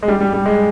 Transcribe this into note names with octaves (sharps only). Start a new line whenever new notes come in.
G#3
G3
G3
G3
G#3